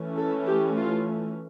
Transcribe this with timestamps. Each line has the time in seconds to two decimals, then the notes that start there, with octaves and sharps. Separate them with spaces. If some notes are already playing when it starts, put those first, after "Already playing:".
Already playing: E3 A3 C#4
0.18 A4
0.47 G4
0.77 F4